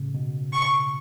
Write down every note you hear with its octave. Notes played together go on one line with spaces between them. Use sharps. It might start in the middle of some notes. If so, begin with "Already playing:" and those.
Already playing: A2 C#3
B2
C#6